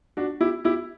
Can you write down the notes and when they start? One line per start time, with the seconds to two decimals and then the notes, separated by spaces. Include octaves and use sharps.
0.17 D4 F#4
0.41 E4 G4
0.65 E4 G4